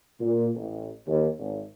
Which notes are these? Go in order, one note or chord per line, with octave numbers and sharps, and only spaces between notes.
A#2
A1
D#2
G#1